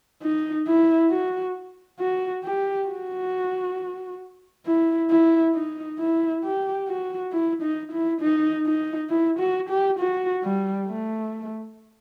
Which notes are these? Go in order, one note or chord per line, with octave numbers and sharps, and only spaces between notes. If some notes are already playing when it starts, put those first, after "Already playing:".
D#4
E4
F#4
F#4
G4
F#4
E4
E4
D#4
E4
G4
F#4
E4
D#4
E4
D#4
D#4
E4
F#4
G4
F#4
G3
A3